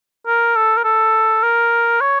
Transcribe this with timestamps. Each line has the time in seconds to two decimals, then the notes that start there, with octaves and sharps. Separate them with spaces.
0.27 A#4
0.56 A4
0.77 A#4
0.84 A4
1.43 A#4
2.01 C#5